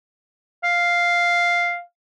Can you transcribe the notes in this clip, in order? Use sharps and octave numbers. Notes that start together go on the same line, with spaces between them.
F5